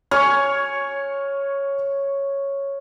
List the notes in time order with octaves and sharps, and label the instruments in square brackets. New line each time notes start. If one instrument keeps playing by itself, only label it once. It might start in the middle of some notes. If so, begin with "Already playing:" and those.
[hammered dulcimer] C#5 [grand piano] G#5 C#6 F6